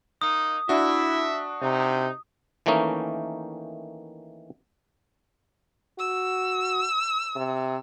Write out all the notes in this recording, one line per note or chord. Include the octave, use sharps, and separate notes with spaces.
A#3 D#4 D#6
D4 E4 F#4 E5
C3 D#4
D#3 E3 A3 A#3 C#4 D#4
F#4 E6
C3